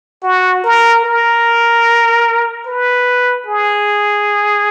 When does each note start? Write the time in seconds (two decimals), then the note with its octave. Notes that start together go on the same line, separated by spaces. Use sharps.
0.23 F#4
0.64 A#4
1.05 A#4
2.67 B4
3.47 G#4